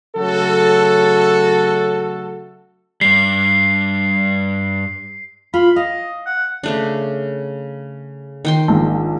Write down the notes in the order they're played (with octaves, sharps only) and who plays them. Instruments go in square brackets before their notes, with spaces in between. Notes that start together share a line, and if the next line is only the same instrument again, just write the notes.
[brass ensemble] C#3 F#3 A3 F#4 A4
[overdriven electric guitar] G2 G3 [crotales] C7
[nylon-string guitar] F4 [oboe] B5
[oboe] D#5 [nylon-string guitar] F5
[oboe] F#5
[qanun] C#3 A3 D4
D#3 G5 C6
[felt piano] A#1 G#2